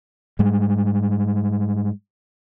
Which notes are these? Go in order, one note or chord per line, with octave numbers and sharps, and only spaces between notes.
G#2 G3 G#3